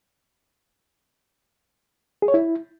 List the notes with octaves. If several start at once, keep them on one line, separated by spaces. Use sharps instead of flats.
G#4
C#5
E4